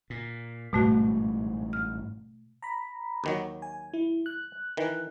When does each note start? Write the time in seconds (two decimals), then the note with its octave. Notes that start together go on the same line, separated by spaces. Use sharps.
0.10 A#2
0.73 A1 G#2 B2 G3 A3 F#4
1.73 F6
2.62 A#5 B5
3.24 D#2 D#3 F#3
3.62 G#5
3.93 E4
4.26 F#6
4.77 D#3 E3